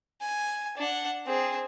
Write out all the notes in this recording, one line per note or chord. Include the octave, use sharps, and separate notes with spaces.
G#5
D4 F#5
C4 G#4